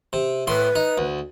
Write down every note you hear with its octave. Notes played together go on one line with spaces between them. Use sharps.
C3
A2 B4 C6
D#4
D2